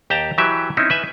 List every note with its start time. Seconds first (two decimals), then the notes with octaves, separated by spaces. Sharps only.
0.10 D#2 G4 G5 A5 A#5
0.38 E3 F#3 G4 B4 E5
0.77 C4 C#4 D#4 E4
0.90 B4 E5 G#5